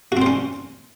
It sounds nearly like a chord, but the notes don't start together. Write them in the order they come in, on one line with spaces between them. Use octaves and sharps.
F#4 C4 C5 C#4